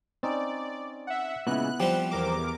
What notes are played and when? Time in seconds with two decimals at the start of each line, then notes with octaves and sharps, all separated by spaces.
0.23 C4 C#4 D#4 D5
1.07 E5 F#5
1.47 A#2 C#3 G#3 B3 E4 F#6
1.80 F3 G3 C4 G4
2.11 E2 A#4 D6